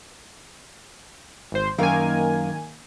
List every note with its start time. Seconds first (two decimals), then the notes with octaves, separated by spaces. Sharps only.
1.52 G#1 C5
1.78 F#2 D#3 A#3 A#4 F5 G#5